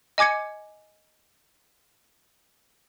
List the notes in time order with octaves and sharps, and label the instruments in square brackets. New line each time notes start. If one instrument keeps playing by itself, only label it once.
[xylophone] D#5 G#5 D6 G#6 C#7